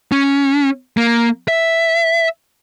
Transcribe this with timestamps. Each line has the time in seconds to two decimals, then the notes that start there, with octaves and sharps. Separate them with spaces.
0.12 C#4
0.97 A#3
1.48 E5